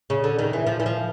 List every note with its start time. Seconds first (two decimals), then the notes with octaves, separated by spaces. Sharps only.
0.10 C#3
0.24 D3
0.39 D#3
0.53 E3
0.66 F3
0.80 E3
0.86 F3